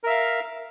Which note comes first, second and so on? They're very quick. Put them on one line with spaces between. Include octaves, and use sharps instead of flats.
A#4 E5 F5